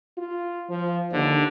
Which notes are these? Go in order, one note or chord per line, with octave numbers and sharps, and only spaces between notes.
F4
F3
D#2 D3